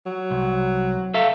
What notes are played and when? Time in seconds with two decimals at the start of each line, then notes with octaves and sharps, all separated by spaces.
0.06 F#3
0.31 C2
1.14 A4 E5 F5